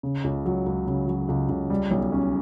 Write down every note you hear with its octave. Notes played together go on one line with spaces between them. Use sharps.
C#3
C#2
F#3
C#2
C#3
F#3
C#2
C#2
G3
B1
C#4